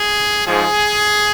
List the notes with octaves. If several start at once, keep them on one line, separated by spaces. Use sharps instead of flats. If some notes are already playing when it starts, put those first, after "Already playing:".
Already playing: G#4
G#2 F3 G#4